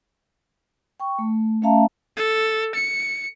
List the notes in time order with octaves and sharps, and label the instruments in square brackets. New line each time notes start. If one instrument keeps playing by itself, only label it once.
[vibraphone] G5 C#6
A3
A3 C#4 E5 F5 A5 A#5
[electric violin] A4
C#7